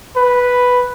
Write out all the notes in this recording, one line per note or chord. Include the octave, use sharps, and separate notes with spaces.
B4